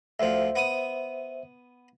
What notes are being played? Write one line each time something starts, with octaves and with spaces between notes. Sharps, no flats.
D2 F3 C5 E5
B3 D#6